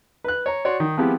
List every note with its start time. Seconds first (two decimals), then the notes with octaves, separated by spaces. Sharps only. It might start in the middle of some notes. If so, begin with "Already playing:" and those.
0.24 B4 F#6
0.46 C#5 A#5
0.65 F#4 C#5 D5 F#5 C6
0.80 D#3
0.97 F3 G#3 B3 C4 E4 G4